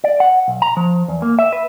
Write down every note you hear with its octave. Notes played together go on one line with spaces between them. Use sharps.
D5
F#5
B1
A#5
F3
E2
A#3
E5
B4